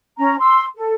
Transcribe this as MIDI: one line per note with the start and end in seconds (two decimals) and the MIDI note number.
0.19 0.35 61
0.19 0.35 82
0.40 0.63 84
0.40 0.63 88
0.76 0.92 69